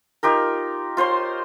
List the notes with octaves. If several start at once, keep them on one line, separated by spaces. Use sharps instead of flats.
D#4 F4 G4 A#4
F4 C5 C#5 C6